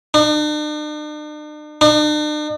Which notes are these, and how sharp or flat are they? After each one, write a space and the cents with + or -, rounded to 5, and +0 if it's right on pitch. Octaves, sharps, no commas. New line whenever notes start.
D4 +45
D4 +45